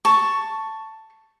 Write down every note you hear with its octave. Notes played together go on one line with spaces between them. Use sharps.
A5 C#6